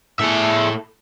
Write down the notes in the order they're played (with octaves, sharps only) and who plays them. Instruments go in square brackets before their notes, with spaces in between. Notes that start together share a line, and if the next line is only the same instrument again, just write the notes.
[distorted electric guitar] A2 A4 [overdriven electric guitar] G#4 E5